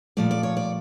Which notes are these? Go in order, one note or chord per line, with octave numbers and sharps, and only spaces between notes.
A#2 F3 A3 D5
D5
C#5
D5